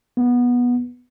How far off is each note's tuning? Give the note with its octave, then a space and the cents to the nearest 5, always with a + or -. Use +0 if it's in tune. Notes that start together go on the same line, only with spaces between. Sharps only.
B3 -15